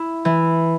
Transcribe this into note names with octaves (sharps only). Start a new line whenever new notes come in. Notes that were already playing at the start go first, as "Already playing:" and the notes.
Already playing: E4
E3